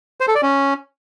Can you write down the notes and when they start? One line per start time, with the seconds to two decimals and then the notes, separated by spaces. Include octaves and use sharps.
0.20 C5
0.28 A4
0.35 D5
0.42 C#4